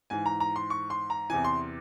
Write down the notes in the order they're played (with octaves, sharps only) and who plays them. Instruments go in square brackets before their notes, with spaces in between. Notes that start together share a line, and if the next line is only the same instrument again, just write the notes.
[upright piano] G#2 E3 G#5
A#5
A#5
C6
C#6
C6
A#5
E2 C3 E3 G#5
C6